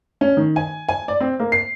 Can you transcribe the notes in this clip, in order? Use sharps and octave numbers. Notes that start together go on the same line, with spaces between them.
C#4
D#3
G#5
G#5
D5
C4
A#3
C7